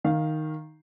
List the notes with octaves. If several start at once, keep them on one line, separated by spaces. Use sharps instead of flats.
D#3 F5